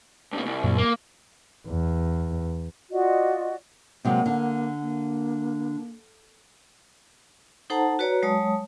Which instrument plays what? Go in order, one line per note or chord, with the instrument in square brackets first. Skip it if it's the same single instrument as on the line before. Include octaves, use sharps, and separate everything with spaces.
[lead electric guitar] G2 B2
C2
[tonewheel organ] F#2 A#2
[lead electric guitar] A#3
[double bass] E2
[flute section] F4 F#4 D5 D#5
[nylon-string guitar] C3 F#3 G#3 [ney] A#3
[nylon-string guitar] D3
[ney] A#3
[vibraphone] D#4 A4 C5 F#5 A5 A#5
F#4 B4 C#5 D5 A#5
F#3 G#3 C#5 A5 D#6